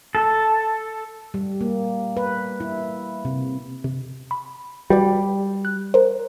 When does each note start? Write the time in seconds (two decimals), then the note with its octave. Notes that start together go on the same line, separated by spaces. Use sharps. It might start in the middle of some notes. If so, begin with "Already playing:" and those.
0.15 A4
1.34 G3
1.61 A#3
2.17 B4
2.60 E4
3.25 C3
3.84 C3
4.31 B5
4.90 G3 F#4 B4 D5
5.65 F#6
5.94 A#4 C5